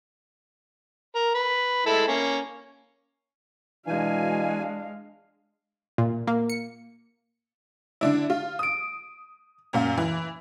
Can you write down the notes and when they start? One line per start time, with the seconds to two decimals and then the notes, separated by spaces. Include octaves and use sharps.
1.15 A#4
1.34 B4
1.86 G#3 E4 A4
2.08 A#3 C#4
3.87 B2 E3 G#3 D4 F5 G#5
5.98 A#2
6.27 A#3
6.50 C#7
8.01 D3 D4 E4
8.30 F4
8.59 D#6 D7
9.73 F#2 A#2 F5
9.97 E3